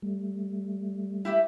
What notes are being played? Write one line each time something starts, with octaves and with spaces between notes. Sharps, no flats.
G3 A3
E4 G4 E5